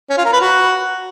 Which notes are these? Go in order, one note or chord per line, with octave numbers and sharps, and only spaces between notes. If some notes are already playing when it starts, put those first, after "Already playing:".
C#4
F4
A#4
B4
F#4